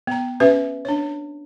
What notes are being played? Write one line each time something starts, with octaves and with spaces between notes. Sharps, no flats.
B3 A#5
C#4 G4 B4 E5
D4 C#5